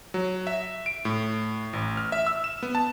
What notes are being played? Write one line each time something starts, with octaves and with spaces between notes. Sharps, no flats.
F#3
E5
D7
A2
A1
F6
E5
E6
E7
B3
A5